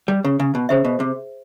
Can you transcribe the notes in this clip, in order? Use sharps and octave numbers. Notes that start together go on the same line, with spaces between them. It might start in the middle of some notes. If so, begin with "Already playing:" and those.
G3
C#3
C#3
B2
C#3 G#4 C5 E5
B2
C3